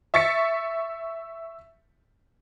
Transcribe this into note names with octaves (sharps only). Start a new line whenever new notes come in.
E5 C#6 A6 B6 C#7